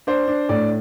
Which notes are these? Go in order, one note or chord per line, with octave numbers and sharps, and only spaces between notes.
D4 C5
D4
A2 D5